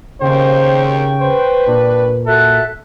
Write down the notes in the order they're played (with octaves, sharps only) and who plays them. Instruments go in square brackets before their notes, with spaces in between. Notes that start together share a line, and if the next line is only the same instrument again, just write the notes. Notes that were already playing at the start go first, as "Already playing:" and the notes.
[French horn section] D#2 C4 [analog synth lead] C#3 [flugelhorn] C5 [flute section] G5 C#6
[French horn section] B4 [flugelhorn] C5
[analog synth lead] A#2 [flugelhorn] D4
[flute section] F#4 E5 F#6 [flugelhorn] A4